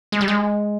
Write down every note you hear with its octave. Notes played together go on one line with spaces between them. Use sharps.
G#3
G3
G#3